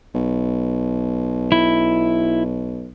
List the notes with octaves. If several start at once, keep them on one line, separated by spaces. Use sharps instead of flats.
B1
E4